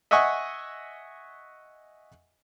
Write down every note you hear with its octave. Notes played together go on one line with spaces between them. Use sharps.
D#5 E5 F#5 G#5 C#6